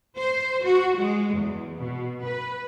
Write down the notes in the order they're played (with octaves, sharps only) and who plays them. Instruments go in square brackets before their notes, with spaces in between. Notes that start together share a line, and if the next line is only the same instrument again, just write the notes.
[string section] C5
F#4
G#3
E2
B2
B4